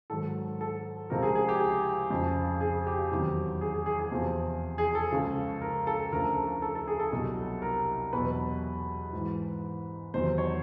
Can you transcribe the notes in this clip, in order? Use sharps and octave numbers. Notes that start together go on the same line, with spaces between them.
G#2 D#3 F#3 A4
A4
C#2 C3 F3 A#4
G#4
G#4
G4
G#4
F2 C#3 F3
G#4
G4
E2 C3 D#3 F#3
G#4
G#4
G#4
G#4
E2 C3 F3
G#4
A4
C#2 C#3 F3
A#4
A4
D2 C#3 F3 A#4
A4
A4
A4
G#4
A4
C2 B2 F#3
A#4
E2 B2 F#3 B4
G#2 E3
E2 C3 D#3 F#3 C5
C#5